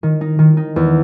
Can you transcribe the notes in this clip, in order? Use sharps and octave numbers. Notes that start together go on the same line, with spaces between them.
D#3
D#4
D#3
D#4
E2